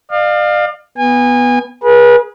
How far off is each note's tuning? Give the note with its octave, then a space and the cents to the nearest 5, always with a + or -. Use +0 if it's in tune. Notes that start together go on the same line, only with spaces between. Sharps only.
D5 +45 F5 +10
B3 -5 G#5 -30
G#4 +0 B4 -35